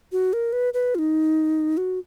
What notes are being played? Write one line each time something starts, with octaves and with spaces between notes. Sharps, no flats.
F#4
A#4
B4
B4
F4
D#4
F#4